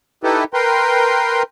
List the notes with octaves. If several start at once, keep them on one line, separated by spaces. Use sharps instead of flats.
D#4 E4 G4 A4 B4
A#4 B4 G5 C6